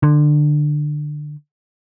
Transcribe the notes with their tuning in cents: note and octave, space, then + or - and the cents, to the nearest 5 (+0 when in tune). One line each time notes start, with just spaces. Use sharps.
D3 +20